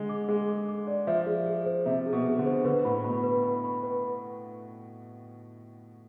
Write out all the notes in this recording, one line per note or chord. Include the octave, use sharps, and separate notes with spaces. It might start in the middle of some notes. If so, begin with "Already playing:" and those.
Already playing: D3 G#3
D6
G#3 G#4
D6
D6
D5
F3 E5
G#4
G#4
C5
C3 E5
G#4
B2
G#4
D3
C5
D3 B4
A2 B5
B2 B5
B4
B5
B5
B4